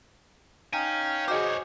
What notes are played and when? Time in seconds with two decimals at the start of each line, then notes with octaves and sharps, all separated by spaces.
0.73 D#4 C#5 F5 G5 G#5
1.28 F#4 G#4 C5 C#5 D#5 D6